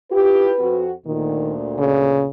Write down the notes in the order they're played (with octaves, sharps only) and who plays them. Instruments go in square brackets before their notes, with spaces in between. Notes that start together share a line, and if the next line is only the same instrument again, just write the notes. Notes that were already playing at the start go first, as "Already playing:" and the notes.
[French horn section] E4 F4 G4 [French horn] B4
[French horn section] F2 C4 F#4
[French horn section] D2 A#2 [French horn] D#3
[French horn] C#3